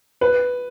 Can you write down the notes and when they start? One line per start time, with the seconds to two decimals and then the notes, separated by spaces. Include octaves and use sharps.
0.21 B4